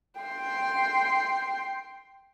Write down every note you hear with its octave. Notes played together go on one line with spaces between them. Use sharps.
G5 C6